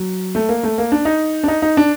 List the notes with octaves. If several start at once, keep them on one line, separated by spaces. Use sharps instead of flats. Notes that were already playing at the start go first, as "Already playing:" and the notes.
Already playing: F#3
A3
A#3
A3
A#3
D4
D#4
D4
D#4
D#4
D4